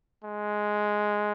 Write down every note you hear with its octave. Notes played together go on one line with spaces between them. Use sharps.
G#3